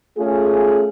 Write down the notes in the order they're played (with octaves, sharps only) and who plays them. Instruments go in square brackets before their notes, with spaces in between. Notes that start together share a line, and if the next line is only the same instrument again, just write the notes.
[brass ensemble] A3 C#4 F4 G#4